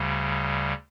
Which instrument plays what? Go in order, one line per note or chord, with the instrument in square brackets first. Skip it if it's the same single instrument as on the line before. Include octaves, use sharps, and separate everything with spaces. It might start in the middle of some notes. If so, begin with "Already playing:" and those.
Already playing: [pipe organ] D2 C#3 G3